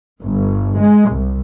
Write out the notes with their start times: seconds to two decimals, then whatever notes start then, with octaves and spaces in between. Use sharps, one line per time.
0.22 G1
0.77 G#3
1.10 C2